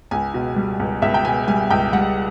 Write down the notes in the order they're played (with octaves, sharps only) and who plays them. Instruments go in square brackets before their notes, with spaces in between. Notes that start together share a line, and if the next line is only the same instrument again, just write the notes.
[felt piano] C#2 G#5
B2
G3
C#2
C#2 E5
G5
B2 G#5
G3 G#5
C#2 G5
G3 F#5